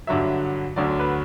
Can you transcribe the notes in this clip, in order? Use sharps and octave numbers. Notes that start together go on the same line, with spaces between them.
G2 D3 F#3 E5
D2 D3 F#3 D5
B4